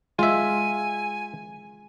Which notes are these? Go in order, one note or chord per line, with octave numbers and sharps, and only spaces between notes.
G#3 F4 E5 G#5